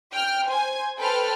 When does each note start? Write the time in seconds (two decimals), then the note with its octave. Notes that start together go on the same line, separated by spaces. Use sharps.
0.13 G5 F6
0.49 C5 G#5
0.99 A4 B4 C5 G5 A5 F6